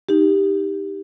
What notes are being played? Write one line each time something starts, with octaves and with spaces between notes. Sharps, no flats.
D#4 G4